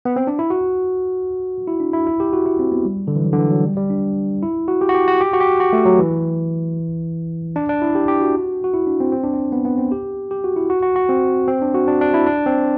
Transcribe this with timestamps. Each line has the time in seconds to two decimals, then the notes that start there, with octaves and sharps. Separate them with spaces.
0.05 B3
0.16 C4
0.27 D4
0.39 E4
0.50 F#4
1.67 E4
1.80 D4
1.93 E4
2.07 E4
2.20 G4
2.33 F#4
2.46 E4
2.59 C4
2.72 B3
2.85 G3
3.07 D3
3.16 E3
3.24 F#3
3.32 D3
3.38 E3
3.51 F#3
3.64 G3
3.77 G3
3.90 D4
4.43 E4
4.68 F#4
4.81 G4
4.89 F#4
4.95 G4
5.08 F#4
5.21 G4
5.33 F#4
5.41 G4
5.60 F#4
5.73 A3
5.86 F#3
5.99 E3
7.56 D4
7.69 D4
7.82 E4
7.95 G4
8.08 G4
8.22 F#4
8.64 F#4
8.74 E4
8.87 D4
9.00 C4
9.12 C4
9.24 D4
9.34 C4
9.52 B3
9.65 B3
9.78 C4
9.92 G4
10.31 G4
10.44 F#4
10.56 E4
10.70 F#4
10.83 F#4
10.96 F#4
11.09 C4
11.48 C4
11.62 D4
11.75 F#4
11.88 D4
12.01 D4
12.14 E4
12.27 D4
12.46 C4